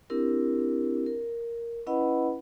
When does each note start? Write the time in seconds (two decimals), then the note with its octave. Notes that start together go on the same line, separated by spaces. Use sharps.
0.10 C4 D4 E4 G4 A#4
1.06 A#4
1.87 C#4 E4 B4 D#5 F#5 B5